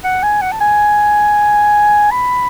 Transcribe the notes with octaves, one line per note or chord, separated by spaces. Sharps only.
F#5
G#5
F#5
A5
G#5
B5